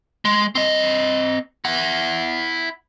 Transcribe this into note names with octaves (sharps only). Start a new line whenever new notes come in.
G#3
C4 D#5
E4 F#5